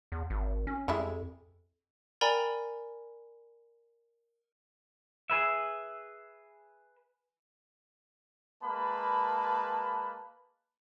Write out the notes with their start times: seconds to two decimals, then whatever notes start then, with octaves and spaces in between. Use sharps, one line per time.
0.12 E2
0.30 G#1
0.67 C#4
0.88 F2 G3 G#3 E4
2.21 A#4 D5 G5 G#5 A#5 B5
5.30 G#4 B4 E5
8.63 G#3 A#3 B4 A5 B5